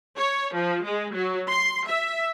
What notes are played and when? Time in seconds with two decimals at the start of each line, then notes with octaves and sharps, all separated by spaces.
0.17 C#5
0.54 F3
0.85 G#3
1.15 F#3
1.50 C6
1.87 E5